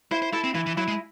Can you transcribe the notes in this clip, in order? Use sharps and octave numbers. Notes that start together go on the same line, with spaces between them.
E4 C5
C5
E4 A4
C4
E3 E4
E3
F#3 E4
G#3